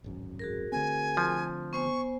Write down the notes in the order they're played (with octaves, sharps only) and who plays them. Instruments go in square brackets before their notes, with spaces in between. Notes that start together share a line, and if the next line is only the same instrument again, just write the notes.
[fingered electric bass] D1 G#1 F#2
[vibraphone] F#4 G#4 A#4
[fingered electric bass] D3 A3 C4 [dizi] G#5
[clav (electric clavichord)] F3
[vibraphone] B3 C5 G#5 [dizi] C#6